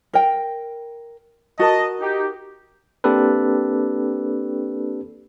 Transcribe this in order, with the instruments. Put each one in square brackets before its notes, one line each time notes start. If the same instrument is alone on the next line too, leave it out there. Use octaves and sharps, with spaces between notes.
[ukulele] A#4 G5
[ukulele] F#4 A#4 [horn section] D#5 A5
[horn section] D#4 G4
[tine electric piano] A#3 C4 D4 G4 A4 B4